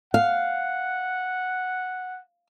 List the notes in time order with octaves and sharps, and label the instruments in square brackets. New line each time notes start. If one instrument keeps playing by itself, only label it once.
[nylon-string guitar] F5 [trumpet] F#5